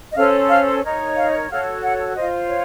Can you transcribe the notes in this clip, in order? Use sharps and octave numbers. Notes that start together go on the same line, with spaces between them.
D#5
C#4 A4 C5 F5
F5
D#4 A#4 C#5
F5
F#4 A4 C#5 F5
F#5
F4 C5 D#5
C#5